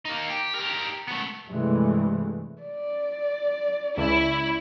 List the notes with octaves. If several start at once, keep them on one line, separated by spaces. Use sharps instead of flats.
A#3 D#4
G4
G4 A#4
A3 B3
G2 C3 E3 G#3 A3
D5
C#2 E4